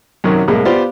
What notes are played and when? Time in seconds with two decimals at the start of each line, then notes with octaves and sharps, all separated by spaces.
0.24 F#2 C3 D#3 F#3 C#4
0.48 C2 A2 G#3 A#3
0.65 B3 F4 G4 C5 D5 F5